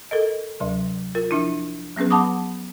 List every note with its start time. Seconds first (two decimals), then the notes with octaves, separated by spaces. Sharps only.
0.11 A4 A#4 D#5
0.60 D2 C3 F#3
1.15 F4 A#4
1.31 F3 D4 E4
1.96 F#3 B3 C#4 G#4 B4
2.10 F#5 A5 B5 D6 D#6